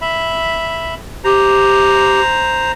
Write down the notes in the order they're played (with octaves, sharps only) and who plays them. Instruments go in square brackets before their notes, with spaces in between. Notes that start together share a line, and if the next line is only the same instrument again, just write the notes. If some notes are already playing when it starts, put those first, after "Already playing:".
[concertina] E5 B5
[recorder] G4 [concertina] C5 A#5